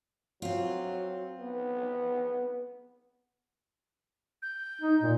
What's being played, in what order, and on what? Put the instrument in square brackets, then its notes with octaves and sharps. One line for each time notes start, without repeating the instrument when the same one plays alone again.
[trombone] F#3 [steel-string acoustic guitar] C4 F4
[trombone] B3
[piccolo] G6
[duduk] D#4
A#2